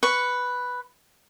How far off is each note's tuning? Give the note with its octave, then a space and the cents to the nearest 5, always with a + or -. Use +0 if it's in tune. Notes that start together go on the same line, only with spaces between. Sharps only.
B4 +0 C#6 +0